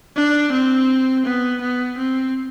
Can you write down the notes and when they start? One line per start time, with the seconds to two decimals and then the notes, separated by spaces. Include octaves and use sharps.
0.16 D4
0.52 C4
1.25 B3
1.61 B3
1.98 C4